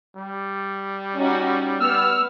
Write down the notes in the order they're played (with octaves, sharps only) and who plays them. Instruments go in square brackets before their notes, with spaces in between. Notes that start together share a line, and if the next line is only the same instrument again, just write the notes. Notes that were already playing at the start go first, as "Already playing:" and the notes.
[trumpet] G3
[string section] C#4 D#4 F#4
[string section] B3 [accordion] E6 F6